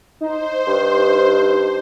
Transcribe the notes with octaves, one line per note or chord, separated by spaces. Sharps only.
D#4 C5
G2